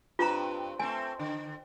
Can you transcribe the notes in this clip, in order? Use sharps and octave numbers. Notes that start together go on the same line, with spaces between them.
G2 C4 F4 B4 A#5
A3 C4 G#5
D3